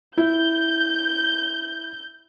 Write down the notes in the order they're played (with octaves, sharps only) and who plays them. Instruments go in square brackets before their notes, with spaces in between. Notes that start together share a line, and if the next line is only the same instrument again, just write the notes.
[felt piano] E4 [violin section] G6